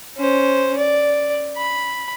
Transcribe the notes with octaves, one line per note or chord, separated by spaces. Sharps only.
C#4 C5
D5
B5